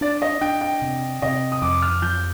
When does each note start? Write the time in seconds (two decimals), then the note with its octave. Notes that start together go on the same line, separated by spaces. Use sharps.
0.01 D4 D5
0.22 D#5
0.41 D4 G5
0.61 G5
0.82 C3
1.22 C3 D#5
1.52 D#6
1.62 F2 D6
1.82 F6
2.02 F3 G6